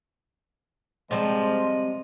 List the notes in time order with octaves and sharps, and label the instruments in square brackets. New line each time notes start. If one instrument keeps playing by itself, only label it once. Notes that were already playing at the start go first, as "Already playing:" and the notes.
[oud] C3 G3 C4 [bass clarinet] F3 [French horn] G#3 [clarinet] D#5